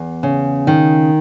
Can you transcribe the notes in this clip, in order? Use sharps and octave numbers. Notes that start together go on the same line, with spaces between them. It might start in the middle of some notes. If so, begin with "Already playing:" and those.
Already playing: E2
C#3
D#3